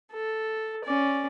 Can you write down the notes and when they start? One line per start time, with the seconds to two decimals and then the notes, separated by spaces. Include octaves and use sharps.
0.12 A4
0.85 C#4 D5